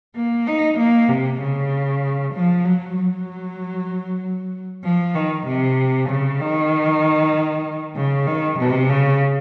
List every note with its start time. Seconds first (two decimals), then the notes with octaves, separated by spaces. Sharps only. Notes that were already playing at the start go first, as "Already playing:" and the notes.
0.16 A#3
0.47 D#4
0.79 A#3
1.09 C3
1.41 C#3
2.34 F3
2.65 F#3
2.96 F#3
4.84 F3
5.15 D#3
5.47 C3
6.09 C#3
6.40 D#3
7.96 C#3
8.27 D#3
8.59 C3
8.90 C#3